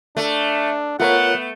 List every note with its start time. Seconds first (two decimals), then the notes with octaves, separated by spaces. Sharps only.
0.17 A3 D4
1.00 A3 B3 F4 A#4 C#5 F#5